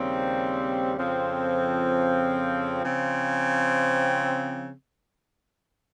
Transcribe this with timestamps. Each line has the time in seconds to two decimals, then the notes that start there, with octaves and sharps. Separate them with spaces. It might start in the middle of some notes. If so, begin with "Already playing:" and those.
Already playing: D#2 C#3 G3 C4
0.96 F2 C#3 F3 C4
2.83 C#3 F3 C4